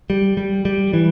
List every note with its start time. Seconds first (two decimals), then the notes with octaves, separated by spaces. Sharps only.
0.10 G3
0.37 G3
0.65 G3
0.94 E3